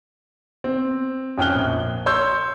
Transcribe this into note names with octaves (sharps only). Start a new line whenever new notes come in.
C4
F2 C#4 G5 F6 F#6 G7
A#1
C#5 C6 E6 G6